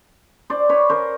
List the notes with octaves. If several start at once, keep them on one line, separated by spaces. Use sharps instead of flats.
C5 D5
B4 C#5
A#4 C5